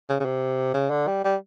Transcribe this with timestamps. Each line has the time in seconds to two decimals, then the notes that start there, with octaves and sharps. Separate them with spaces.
0.09 C#3
0.20 C#3
0.25 C3
0.74 C#3
0.90 D3
1.07 G3
1.24 G3